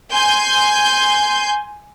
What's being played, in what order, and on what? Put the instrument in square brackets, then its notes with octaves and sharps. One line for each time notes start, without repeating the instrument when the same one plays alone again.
[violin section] G#5 C6 G6